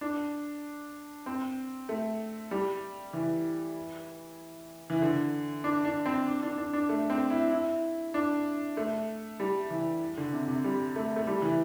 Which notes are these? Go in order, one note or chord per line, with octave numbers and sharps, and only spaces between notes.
D4
C4
A3
G3
E3
E3
D3
D4
D4
C4
D4
D4
D4
D4
A3
C4
E4
E4
D4
A3
G3
E3
D3
C3
C3
G3
A3
A3
G3
E3